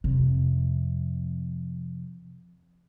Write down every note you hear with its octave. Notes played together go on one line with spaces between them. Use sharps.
F2 C3